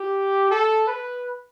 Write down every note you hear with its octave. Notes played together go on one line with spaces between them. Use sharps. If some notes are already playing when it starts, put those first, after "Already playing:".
Already playing: G4
A4
B4